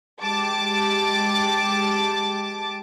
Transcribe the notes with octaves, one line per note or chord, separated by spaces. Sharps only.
G#3 G4 A5 D6